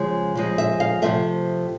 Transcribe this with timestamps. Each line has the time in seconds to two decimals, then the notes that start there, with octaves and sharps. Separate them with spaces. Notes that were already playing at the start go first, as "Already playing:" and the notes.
Already playing: C#3 F3 G#3
0.35 C#3 F3 G#3
0.58 E5
0.80 F5
1.02 C3 F3 A3 E5